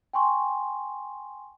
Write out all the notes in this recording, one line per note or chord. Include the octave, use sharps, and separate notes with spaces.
G5 G#5 C6 C#6